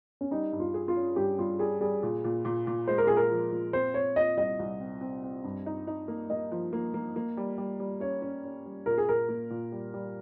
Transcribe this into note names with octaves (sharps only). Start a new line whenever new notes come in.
C#4
G3 D#4
G2
F4
G#4
F4
C#4
G2 G4
G3 F4
G3 G#4
G3 G#4
A#2
A#2
A#2
A#2
G#3 C5
A#4
A#2 G#4
A#4
F3
A#2
C4 C5
C4 C#5
A#2 D#5
C2 D#5
C2
C4
C4
C4
G2
D#4
D#4
A#3
A#3 D#5
F3
A#3
A#3
A#3
G3
G3
G3
C#4 C#5
C#4
C#4
G3
A#2 A#4
G#4
A#2 A#4
A#3
A#2
G3
G3